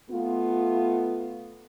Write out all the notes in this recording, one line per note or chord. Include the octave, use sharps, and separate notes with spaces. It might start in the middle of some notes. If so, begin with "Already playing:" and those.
A3 B3 F4